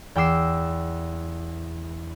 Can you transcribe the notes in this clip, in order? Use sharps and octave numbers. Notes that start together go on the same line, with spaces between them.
E2 G5 D6 E6 C7